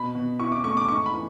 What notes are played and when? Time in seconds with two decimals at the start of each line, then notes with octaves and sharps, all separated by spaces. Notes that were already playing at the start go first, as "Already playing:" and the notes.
Already playing: B2 B5
0.15 B2
0.39 E4 C#6
0.52 D6
0.64 A3 C#6
0.77 D6
0.88 G#2 C#6
1.06 B5
1.14 E3